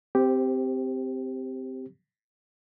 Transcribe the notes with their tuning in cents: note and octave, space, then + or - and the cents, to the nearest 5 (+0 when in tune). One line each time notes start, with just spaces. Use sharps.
C4 -15 G4 +0 C5 +20